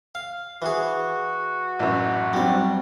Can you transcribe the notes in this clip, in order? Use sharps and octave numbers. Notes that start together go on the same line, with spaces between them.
F5
E3 F#4 G#4
A1 F#2
F#3 G3 C4 D5